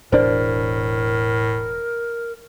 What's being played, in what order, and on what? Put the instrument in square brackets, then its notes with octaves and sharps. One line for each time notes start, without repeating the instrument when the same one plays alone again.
[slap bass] E1 D4 [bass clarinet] A2 [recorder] A#4 [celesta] C5 D5